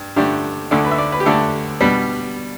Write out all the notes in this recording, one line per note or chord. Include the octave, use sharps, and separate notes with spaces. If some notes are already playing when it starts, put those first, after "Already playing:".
Already playing: G2
G2 D3 A3 D4 G4
D2 D3 A3 D4 A4
B4
E5
D5
B4
G4
D2 D3 A3 D4 A4
B2 G3 B3 D4